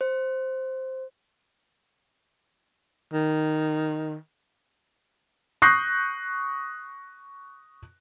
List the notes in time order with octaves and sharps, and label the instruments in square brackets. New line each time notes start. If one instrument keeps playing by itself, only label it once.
[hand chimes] C5
[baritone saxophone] D#3
[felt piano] C#6 D#6 F#6 G6 A#6 C7